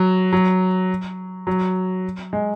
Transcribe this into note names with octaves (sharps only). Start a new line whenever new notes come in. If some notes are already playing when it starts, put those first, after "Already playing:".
Already playing: F#3
F#3
F#3
G#3